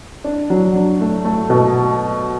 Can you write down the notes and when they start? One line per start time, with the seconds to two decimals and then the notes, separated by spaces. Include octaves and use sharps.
0.24 D4
0.50 F#3
0.76 D4
1.01 A3
1.25 A3
1.50 B2